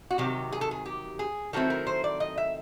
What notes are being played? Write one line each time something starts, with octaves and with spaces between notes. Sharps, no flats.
F#4
C3 D#3 F#3 G4
G#4
A4
G#4
G4
G#4
D#3 F#3 A3 C4 E4 A4
A#4
C5
D5
D#5
E5